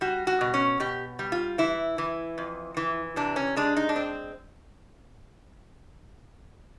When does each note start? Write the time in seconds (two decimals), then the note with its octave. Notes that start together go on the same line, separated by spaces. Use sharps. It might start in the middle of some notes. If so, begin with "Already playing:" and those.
0.01 G3 F#4
0.27 F#4
0.41 B2
0.54 C#4
0.80 B2 G4
1.19 G3
1.32 F4
1.58 E3 E4
1.98 E3
2.38 F2
2.77 E3
3.16 C3 D4
3.36 C#4
3.56 G#3 D4
3.77 D#4
3.89 D4
3.96 C4